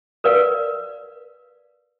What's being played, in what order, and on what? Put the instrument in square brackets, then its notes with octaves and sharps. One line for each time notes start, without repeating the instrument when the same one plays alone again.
[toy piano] A#4 B4 D5 F5